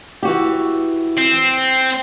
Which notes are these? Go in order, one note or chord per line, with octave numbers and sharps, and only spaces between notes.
E3 F#4 G4
C4